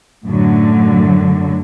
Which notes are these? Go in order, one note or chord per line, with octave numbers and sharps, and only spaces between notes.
F#2 A2 D3 F#3